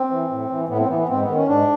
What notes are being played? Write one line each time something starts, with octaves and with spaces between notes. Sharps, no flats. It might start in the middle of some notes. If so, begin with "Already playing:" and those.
Already playing: C4
E3
A2
E3
A2 B3
C4
E3 B3
B3
G#2 C4
B3
D#3
C#4
G#2 D4